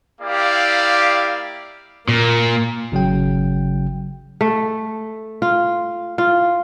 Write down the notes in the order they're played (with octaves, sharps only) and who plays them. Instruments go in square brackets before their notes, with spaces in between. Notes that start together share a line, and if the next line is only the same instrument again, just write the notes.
[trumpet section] A#3 E4 G4 D5 F5
[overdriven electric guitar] A#2 [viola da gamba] A#3
[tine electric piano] G#1 C#3 F#3 G5
[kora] A3
F4
F4